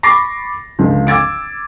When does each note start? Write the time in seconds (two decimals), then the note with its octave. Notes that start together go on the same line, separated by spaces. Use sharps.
0.03 B5 C#6 D6 A6 A#6 C7
0.79 C#2 D3 F3
1.07 D6 E6 G#6 A6 D7